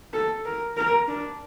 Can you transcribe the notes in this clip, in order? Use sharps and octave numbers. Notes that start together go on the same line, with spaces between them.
A4
A#4
A#4
D4